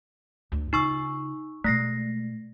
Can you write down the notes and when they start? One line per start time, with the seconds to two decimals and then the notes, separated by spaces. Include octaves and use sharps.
0.52 D2
0.73 C#3 D#4 F4 C#6 E6
1.64 B2 G#3 A3 A#6 C7